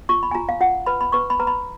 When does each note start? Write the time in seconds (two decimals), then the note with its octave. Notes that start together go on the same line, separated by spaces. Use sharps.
0.09 F4 C#6
0.23 B5
0.31 G#5
0.35 F4 A#5
0.49 F5
0.61 F4 F#5
0.86 B4 B5
1.01 B5
1.12 B4 C#6
1.30 B5
1.40 B4 A#5
1.47 B5